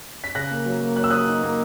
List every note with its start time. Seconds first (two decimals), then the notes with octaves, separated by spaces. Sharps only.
0.24 B6
0.35 C#3 F#6 A#6
0.51 A#3
0.66 F#3
0.81 A#3
0.96 F#3 F#6
1.04 E6
1.10 F#3 D#6 F#6
1.28 D#4
1.43 A#3